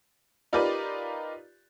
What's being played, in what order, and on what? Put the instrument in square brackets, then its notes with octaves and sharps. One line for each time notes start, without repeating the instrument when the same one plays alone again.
[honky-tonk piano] D#4 F4 G4 A#4 B4 D5